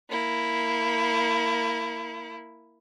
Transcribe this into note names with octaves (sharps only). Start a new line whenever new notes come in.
A#3 E4